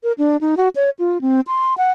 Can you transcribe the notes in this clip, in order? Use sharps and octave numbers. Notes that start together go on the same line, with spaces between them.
A#4
D4
D#4
F#4
C#5
F4
C4
C6
F#5